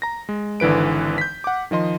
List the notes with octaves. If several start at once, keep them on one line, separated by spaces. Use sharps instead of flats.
A#5 A#6
G#3
G#1 D3 E3 B4 D7
G6 B6
F#5 D6
D#3 F3 D#5 C6